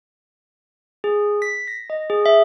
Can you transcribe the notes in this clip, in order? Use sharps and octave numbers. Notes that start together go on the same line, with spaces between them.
G#4
B6
A#6
D#5
G#4
E5